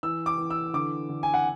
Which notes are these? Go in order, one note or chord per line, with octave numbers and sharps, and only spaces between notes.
E3 E6
D6
E3
E6
D3 D6
D3
G#5
F#5